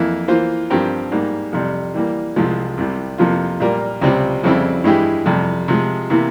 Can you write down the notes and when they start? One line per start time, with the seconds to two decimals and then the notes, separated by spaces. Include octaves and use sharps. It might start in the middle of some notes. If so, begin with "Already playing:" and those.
Already playing: F2 E3 A#3 E4
0.28 E3 A#3 F4 C5
0.70 G2 F3 C4 G4 A#4
1.12 G#2 G3 A#3
1.53 F2 C3 G3
1.94 E3 G3 A#3
2.36 C2 C3 F3 G#3
2.77 C2 C3 G3
3.18 F2 C3 F3 A#3 F4
3.60 A#2 G3 A#3 F4 A#4
4.02 C#2 C3 G3 C4 F4
4.44 F2 C#3 G3 C4 E4
4.84 G2 E3 G#3 E4 G4
5.26 F2 C3 G3
5.68 C3 F3 G#3
6.10 C3 E3 A#3 E4